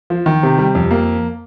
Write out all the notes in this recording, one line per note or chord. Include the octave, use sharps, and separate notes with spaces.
F3
D#3
C3
G3
F2
A#3